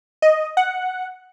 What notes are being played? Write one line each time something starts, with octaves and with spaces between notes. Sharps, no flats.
D#5
F#5